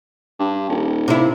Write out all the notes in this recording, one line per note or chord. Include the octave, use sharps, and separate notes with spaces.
G2
D#1
C3 E4